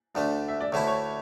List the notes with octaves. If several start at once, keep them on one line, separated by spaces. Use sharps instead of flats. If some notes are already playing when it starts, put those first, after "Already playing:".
D2 D3 A3 D4
E5
D5
D2 D3 A3 E4 C#5
C#5